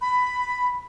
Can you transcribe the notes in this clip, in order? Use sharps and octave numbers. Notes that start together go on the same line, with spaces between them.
B5